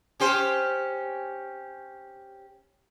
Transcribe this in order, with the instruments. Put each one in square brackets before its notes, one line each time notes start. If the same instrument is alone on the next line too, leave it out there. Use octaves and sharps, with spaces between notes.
[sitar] C#4 G4 C5